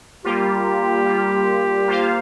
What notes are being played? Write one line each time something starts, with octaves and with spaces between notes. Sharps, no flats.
G3 A#3 F4 G4
G3 A#3 F4
A#3 F4 C5 F5